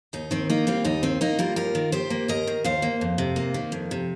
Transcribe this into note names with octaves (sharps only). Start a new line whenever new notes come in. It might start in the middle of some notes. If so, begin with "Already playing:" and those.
D#2 D#4
D#3 C4
A#3 D#4
G3 C4 F4
D#2 D#4
D#3 C4
A#3 D#4
G3 F4 A#4
D#2 F4 A#4
D#3
D#2 G4 C5
A#3
D#2 A#4 D#5
D#3
D#2 C5 F5
A#3
F2
C3
A#3
D#3
F2
C3